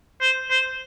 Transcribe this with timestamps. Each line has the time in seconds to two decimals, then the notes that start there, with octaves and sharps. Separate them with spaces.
0.21 C5
0.50 C5